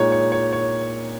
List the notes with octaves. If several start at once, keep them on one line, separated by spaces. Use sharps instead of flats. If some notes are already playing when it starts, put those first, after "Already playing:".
Already playing: A#2 G#3 D#4 C#5
C#5
C#5
C#5